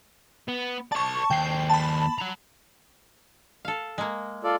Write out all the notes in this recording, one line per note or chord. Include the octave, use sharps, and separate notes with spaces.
B3
C5 D5 A5 C#6
D#2 C5 G5 C7
A5 B5
F#4 A#5
A4 F5
G#3 A#3
F4 A4 D5